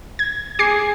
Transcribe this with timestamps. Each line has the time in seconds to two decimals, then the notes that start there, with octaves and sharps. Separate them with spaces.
0.19 G#6
0.59 G#4 D6 G#6 C7